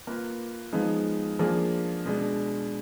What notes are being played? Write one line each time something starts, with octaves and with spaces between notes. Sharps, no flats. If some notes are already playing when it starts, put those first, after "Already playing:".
A#3 F4 B4
F3 G#3 B3 D#4
F3 A#3 D4 G#4
B2 G#3 D4